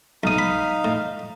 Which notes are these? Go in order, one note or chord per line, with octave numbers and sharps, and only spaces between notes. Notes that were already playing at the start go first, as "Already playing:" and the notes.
B1 D#4 F5 D#6
B5
A2